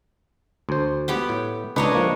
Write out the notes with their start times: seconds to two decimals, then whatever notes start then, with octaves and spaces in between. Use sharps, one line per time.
0.69 D2 C5
1.08 B3 G4 G5
1.29 A2
1.76 C#2 D4 D#4 B4 C#5 D#5
1.95 F3 A#3